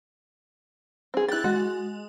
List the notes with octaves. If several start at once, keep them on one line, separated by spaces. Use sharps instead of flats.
C4 G#4
E4 G4 F#6 A6
G#3 F#4